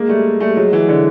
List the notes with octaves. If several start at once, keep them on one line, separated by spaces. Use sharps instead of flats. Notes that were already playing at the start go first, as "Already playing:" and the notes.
Already playing: G#3 A#3
G3 A3
G3 A3
F#3 G#3
E3 F#3
D3 E3